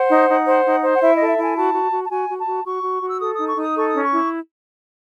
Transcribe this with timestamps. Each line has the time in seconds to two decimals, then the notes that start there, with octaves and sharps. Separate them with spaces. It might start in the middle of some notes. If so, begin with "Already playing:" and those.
Already playing: C5 F#5
0.10 D#4
0.28 D#4
0.47 C5
0.65 D#4
0.83 C5
0.93 F#5
1.02 E4 E5
1.15 D#5
1.20 A4
1.28 E5
1.38 E4 G#5
1.56 F#4 A5
1.74 F#4
1.92 F#4
2.04 A5
2.10 F#4 G#5
2.30 F#4
2.38 A5
2.48 F#4
2.65 F#4 C#6
2.84 F#4
3.02 F#4
3.10 E6
3.20 A4 D#6
3.34 D#4 D#6
3.48 C#6
3.57 D#4 D#6
3.75 A4 C#6
3.88 D#6
3.93 C#4
4.02 C#6
4.12 E4